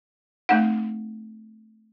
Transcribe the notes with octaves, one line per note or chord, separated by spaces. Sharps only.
A3 C4 D#4 F#5